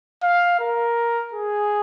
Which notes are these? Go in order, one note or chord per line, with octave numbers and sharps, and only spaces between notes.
F5
A#4
G#4